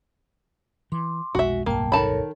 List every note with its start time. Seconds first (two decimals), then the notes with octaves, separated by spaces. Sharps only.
0.92 E3 C6 D6
1.35 F1 B1 G#3 F#4 E5
1.66 D1 B1 G2 A#3 G5 A5
1.92 D#3 A4 A#4 C#5 A5 B5